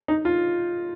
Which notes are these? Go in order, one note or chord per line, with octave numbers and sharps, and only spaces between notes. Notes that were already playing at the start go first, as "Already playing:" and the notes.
D#4
F4